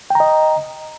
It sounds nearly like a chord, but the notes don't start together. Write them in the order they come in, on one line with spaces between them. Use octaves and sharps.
G5 A#5 D#5